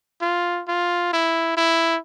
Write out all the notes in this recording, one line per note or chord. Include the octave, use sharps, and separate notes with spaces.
F4
F4
E4
E4